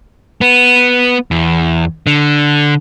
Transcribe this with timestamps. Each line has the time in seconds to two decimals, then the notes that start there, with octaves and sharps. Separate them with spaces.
0.41 B3
1.31 E2
2.07 D3